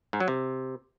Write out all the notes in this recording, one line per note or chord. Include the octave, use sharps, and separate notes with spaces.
G#2
F#3
C3